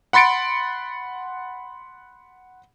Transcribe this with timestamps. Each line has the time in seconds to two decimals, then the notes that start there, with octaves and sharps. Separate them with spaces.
0.13 F#5 B5 C6 A6 C#7 D7